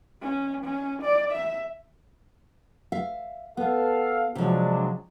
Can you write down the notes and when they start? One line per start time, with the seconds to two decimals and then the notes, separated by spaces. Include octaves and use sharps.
0.21 C#4
0.64 C#4
1.02 D5
1.32 E5
2.92 E5 F5
3.57 B3 A4 F5
4.35 C3 F3 F#3 G#3 D4